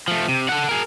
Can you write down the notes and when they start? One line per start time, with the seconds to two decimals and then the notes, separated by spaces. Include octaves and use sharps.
0.08 F3 A3
0.29 C3
0.49 A4 F#5
0.69 G#4 A#4